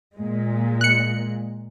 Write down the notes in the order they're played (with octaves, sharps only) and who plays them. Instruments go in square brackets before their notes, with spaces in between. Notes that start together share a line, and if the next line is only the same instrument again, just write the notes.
[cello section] A#2 G#3
[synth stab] F#6 C#7